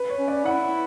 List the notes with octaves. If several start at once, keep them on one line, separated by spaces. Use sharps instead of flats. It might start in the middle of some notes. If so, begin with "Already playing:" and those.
Already playing: B4
C#5
C#4
D5
E4 F#5